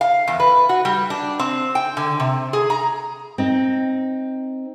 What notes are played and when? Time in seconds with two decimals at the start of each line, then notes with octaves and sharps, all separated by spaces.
0.01 F5
0.28 E2
0.40 B4
0.69 F#4
0.85 G3
1.10 D4
1.39 C4
1.75 G5
1.97 D3
2.20 C3
2.53 G#4
2.70 A#5
3.38 C4 D#4